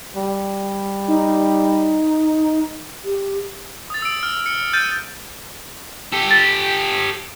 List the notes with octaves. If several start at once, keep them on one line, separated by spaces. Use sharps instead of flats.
G3
D#4
G4
D#6 A6
E6 D7
F6
C#7
F6 G6 A6 D#7
G4 A4
A6